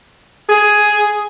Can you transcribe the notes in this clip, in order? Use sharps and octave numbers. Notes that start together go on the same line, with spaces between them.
G#4